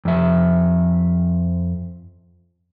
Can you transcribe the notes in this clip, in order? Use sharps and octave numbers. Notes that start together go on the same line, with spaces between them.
F2 E5